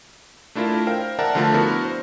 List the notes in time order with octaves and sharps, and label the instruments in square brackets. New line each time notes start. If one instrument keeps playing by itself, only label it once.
[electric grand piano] A3 D4 E4 F4 A#4
A#4 C5 F5 G5
A#4 D5 E5 F#5 A5 A#5
D3 F3 A3 F4 A#4 A5
B3 D4 E4 F#4 A#4
C5